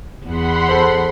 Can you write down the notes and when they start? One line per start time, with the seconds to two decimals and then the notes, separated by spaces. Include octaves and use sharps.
0.25 E2 F#5 B5 C6
0.69 A4 C5